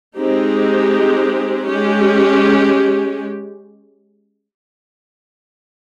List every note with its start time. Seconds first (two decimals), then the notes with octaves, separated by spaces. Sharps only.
0.17 G#3 C4 D#4 G4
1.67 G#3 C#4 G4